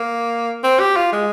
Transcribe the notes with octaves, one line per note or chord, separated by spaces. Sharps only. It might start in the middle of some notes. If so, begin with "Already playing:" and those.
Already playing: A#3
C4
G4
F4
G#3